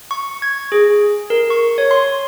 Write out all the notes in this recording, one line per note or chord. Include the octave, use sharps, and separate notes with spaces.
C#6
G#6
G#4
A#4
C#6
C#5
C6